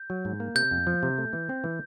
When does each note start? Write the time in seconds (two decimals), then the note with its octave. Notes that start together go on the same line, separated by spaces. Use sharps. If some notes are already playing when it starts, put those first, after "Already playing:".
Already playing: G6
0.10 F#3
0.25 G#2
0.40 A#3
0.55 C3 G6
0.71 F2
0.87 F3
1.03 C3
1.18 A3
1.33 E3
1.49 C4
1.64 E3